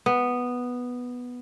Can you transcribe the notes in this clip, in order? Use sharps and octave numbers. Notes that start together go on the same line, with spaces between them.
B3